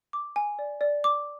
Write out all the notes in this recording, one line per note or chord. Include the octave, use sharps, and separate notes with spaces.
D6
G#5
D5
D5
D6